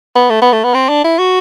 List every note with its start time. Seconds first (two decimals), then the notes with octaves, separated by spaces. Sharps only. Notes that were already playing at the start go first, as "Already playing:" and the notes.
0.15 B3
0.30 A3
0.42 B3
0.53 A3
0.64 B3
0.74 C4
0.89 D4
1.04 E4
1.19 F#4